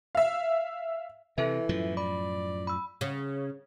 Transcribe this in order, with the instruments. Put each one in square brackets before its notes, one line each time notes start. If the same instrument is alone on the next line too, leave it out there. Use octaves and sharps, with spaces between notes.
[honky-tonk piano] E5 F5
[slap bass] C3 [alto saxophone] E3 [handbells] E4 A4 E5
[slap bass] F#2 A2 F3
[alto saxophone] D5 [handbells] B5
[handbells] B5 E6
[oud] C#3